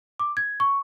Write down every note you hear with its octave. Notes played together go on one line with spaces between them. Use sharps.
D6
G#6
C#6